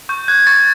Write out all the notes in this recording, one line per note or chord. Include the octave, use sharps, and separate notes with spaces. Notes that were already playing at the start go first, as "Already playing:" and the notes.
C#6 G6
F#6 G#6
C#6 A6